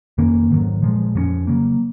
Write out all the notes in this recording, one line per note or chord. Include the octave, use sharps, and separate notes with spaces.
F2 D#3 A#3 C#4
G#2 D#3 F#3
A#2 F3 G#3
F2 F3 G#3 C#4
C#3 F#3 A#3